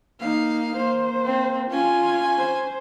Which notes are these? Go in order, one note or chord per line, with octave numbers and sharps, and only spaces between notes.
A#3 D#4 F5
A#3 C5
C4
C#4 F4 G#5
C5